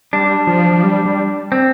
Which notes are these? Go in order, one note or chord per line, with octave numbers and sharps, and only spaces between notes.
G3 D4
F3
F3
G3
G3
C4